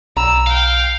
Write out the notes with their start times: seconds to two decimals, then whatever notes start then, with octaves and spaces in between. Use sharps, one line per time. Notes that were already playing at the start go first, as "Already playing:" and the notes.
0.17 B1 A#5 E6
0.47 F5 G5